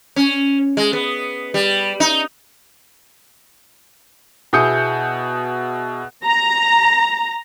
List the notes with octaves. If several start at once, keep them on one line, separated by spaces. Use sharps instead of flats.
C#4
G#3
B3
G3
D#4
B2 E4 G#4 D#6 G6 C#7
A#5